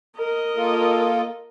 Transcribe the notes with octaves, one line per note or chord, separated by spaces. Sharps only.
A#4 D#5
A#3 F4 A4